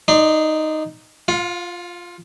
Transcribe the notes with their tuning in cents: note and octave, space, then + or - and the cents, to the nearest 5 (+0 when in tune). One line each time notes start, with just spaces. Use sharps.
D#4 +0 D5 +25 C6 -20
F4 +0 F5 +45